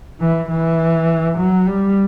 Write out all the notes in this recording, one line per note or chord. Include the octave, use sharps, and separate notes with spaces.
E3
E3
F#3
G3